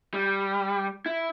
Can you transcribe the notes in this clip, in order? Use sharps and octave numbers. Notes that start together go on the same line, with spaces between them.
G3
E4